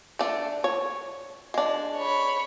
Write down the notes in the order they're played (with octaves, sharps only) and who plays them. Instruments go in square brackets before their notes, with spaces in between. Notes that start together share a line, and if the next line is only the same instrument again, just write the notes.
[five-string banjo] A3 D4
C#5
G#3 D4
[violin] C#5 B5